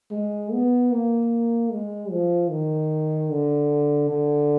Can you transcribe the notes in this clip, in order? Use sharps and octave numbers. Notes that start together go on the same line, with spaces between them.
G#3
B3
A#3
G#3
F3
D#3
D3
D3